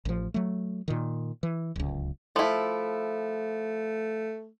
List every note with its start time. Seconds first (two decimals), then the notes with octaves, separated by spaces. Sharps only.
0.05 A1 F3
0.34 F#3 A3
0.88 A#2 D#3
1.43 E3
1.76 D1 C#2
2.36 F3 A3 E4